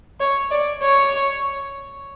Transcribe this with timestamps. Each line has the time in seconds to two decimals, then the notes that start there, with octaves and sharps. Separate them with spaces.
0.20 C#5
0.51 D5
0.82 C#5